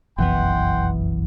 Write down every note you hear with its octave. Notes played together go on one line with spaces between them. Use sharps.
F1 B1 F#2 E3 B3 F#5 G5 C6